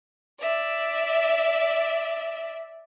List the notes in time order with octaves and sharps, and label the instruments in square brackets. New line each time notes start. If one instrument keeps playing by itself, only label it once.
[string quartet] D5 E5